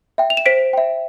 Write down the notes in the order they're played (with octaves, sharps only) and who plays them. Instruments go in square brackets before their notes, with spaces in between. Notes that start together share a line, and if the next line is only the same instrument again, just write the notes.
[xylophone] E5 G5
F7
E7
C5 B6 D7
E5 G5